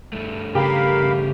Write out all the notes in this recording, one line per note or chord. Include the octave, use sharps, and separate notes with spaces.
G2 A3
C#3 G4 A#4 F5 B5